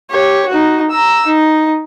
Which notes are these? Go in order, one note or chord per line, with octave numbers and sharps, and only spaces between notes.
G4 C#5
D#4 F#4
A#5 E6
D#4